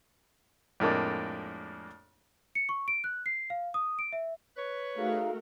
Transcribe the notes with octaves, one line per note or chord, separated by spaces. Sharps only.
F2 A2 G#3 A#3 D4
C#7
C#6
D7
F#6
C7
F5
D#6
D7
E5
B4 C#5
A3 D#4 F#4 G#4 A#4 F5